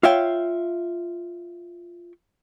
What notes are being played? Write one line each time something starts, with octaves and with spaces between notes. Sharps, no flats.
F4 C#5 E5 F5 G5